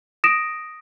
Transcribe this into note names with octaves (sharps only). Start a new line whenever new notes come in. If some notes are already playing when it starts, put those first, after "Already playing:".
D#6 A#6 D7 E7